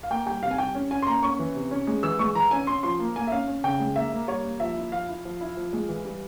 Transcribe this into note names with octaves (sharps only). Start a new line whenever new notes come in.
F5
A#3 G5
G3 G5
C3 F5
G#5
G3 G5
C#4
C#4 G#5
C6
A#3 A#5
C#4 C#6
E3
C3
C#4
G#3
E3 E6
G#3 C#6
E3 A#5
C#4 G#5
C#4 C6
F3 C6
A#3
A#3 G#5
E5
C#4 F5
C#4
C#3 G5
G#3
A#3 E5
A#3
G3 C#5
A#3
F3 E5
E4
F3 F5
E4
F3
E4
F3
G#3
E3
G3